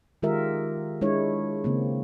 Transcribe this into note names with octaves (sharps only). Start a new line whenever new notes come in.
D#3 G#3 F4 G4 A#4 E5
G#3 D4 E4 C#5
C#3 A#3 C4